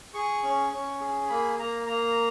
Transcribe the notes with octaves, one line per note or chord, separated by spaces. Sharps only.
G#4 C#6
C#4
C#4
G#4
A#3 B5
A#3 A#5
A#3 A#5